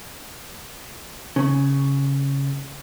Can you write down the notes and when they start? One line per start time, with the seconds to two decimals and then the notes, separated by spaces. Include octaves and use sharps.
1.36 C#3